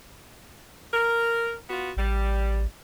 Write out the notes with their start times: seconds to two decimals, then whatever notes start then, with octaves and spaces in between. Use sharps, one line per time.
0.92 A#4
1.70 B3 F4 F#4
1.97 A1 G3